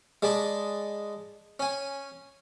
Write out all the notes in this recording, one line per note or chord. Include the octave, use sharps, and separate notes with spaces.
G#3 D5 A5 B5 D6
C#4 G#5